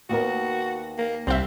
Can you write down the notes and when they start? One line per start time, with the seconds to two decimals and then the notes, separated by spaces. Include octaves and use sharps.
0.09 D#2 B3 F#4 A#4
0.98 A#3
1.27 C2 C4 E5